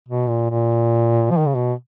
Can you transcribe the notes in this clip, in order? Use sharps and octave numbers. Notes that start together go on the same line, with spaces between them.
B2
A#2
A#2
F3
D#3
C#3
B2